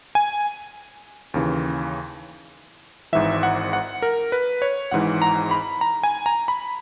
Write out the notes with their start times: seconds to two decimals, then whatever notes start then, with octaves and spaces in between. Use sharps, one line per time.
0.15 G#5
1.34 D#2 C#3 E3
3.13 G#1 G#2 E3 E5
3.43 F#5
3.73 F#5
4.02 A#4
4.32 B4
4.62 C#5
4.91 G#1 G#2 E3 F#5
5.22 A#5
5.51 B5
5.81 A#5
6.03 G#5
6.26 A#5
6.48 B5